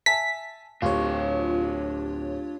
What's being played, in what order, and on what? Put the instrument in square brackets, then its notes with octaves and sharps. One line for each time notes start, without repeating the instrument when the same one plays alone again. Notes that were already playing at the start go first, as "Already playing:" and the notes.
[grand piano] E5 G#5 A5 [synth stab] B6
[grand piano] D1 [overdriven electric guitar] D4 F5 [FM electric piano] F4 G4 C#5